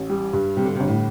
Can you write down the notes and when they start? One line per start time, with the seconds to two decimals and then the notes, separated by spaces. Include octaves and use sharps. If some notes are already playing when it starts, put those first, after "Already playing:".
Already playing: A1
0.10 G3
0.33 G2
0.57 C3 G3
0.66 D3
0.75 C3
0.80 G1
0.88 A2